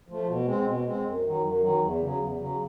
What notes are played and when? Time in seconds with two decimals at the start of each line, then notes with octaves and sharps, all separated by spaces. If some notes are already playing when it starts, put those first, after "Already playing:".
0.08 F3 A3
0.27 B2
0.46 G#3 C4
0.66 B2
0.85 G#3 C4
1.04 F#2
1.23 D#3 F#3
1.42 F#2
1.61 D#3 F#3
1.81 E2
2.00 C#3 F#3
2.19 E2
2.38 C#3 F#3